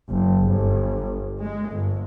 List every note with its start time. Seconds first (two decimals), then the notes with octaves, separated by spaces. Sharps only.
0.10 F#1
0.47 G1
1.41 G#3
1.71 G1